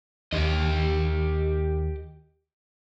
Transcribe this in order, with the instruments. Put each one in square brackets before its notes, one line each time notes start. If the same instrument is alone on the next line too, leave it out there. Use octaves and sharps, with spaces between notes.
[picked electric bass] D#2 [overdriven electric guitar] G4 D#5